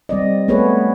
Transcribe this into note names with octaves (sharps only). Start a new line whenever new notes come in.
G3 C4 D5 D#5
A3 B3 G#4 B4 C#5